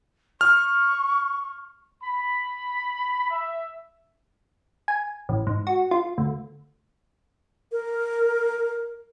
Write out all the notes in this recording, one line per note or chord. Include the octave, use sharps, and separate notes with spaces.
C#6 F6
B5
E5
G#5
A1
G#2
F#4
F4
D2
A#4